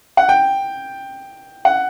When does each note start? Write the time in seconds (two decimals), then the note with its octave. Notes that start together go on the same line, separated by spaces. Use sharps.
0.17 F#5
0.29 G5
1.65 F#5